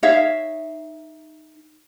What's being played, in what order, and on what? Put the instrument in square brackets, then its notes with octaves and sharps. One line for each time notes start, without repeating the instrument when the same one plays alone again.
[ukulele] D#4 C#5 E5 F5